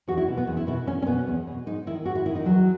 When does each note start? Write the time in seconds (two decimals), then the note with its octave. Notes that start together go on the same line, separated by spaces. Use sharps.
0.07 E2 F#4
0.17 E4
0.28 B2
0.37 B3
0.47 E2
0.57 E4
0.67 B2 E4
0.87 E2 C#4
1.02 C#4
1.06 B2 B3
1.27 E2
1.47 B2
1.66 G#2 D#4
1.87 D#3 E4
2.05 G#2 F#4
2.15 E4
2.26 D#3 E4
2.35 D#4
2.45 E2 F#3